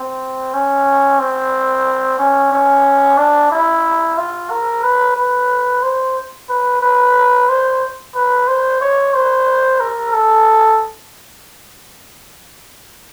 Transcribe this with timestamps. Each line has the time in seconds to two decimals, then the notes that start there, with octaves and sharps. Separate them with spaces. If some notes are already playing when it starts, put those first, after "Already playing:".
Already playing: C4
0.53 C#4
1.19 C4
2.19 C#4
2.52 C#4
3.17 D4
3.51 E4
4.17 F4
4.50 A#4
4.83 B4
5.17 B4
5.82 C5
6.49 B4
6.82 B4
7.49 C5
8.15 B4
8.47 C5
8.81 C#5
9.14 C5
9.80 A#4
10.13 A4